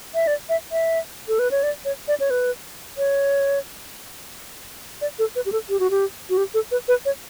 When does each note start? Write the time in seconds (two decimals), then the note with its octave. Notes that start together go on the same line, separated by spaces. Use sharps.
0.15 E5
0.27 D5
0.49 E5
0.72 E5
1.28 A4
1.39 B4
1.51 C#5
1.63 D5
1.85 C#5
2.08 D5
2.20 C#5
2.30 B4
2.98 C#5
5.01 D5
5.19 A4
5.36 B4
5.46 G4
5.52 A4
5.70 G4
5.80 F#4
5.91 G4
6.30 F#4
6.37 G4
6.54 A4
6.71 B4
6.88 B4
7.05 C#5